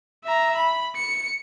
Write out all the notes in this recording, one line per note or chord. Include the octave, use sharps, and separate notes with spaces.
E5 A#5
B5
C#7